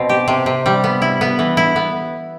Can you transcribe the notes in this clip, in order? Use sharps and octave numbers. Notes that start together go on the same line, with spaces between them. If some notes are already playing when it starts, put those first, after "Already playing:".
Already playing: B2 C4
G4
C3
C3
G3
B3
E4
B3
E3
E4
B3